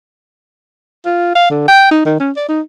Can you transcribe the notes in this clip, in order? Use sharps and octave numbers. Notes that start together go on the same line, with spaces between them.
F4
F5
D3
G5
D#4
D#3
C#4
D5
D#4